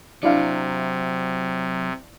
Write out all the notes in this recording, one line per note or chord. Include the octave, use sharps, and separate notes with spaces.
C3 F#3 D4 E4 F5